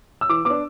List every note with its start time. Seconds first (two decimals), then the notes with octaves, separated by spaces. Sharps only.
0.21 E6
0.29 E3 D6
0.45 B3 D4 D6